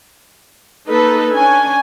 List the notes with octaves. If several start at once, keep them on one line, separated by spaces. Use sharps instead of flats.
A#3 D#4 A4 B4
C#4 D4 G#5